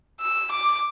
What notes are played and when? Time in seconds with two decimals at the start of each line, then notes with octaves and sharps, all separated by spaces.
0.21 E6
0.52 D6